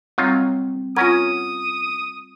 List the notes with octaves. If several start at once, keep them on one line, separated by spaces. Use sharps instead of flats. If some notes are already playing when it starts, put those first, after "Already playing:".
F#3 G3 C4 D#4 F4
C#4 F4 A#4 F#5 D#6 G#6